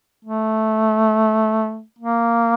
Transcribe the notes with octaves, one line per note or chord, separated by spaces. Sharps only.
A3
A#3